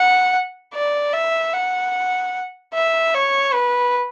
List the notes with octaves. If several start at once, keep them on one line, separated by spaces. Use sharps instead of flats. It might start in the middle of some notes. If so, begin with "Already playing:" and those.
Already playing: F#5
D5
E5
F#5
E5
C#5
B4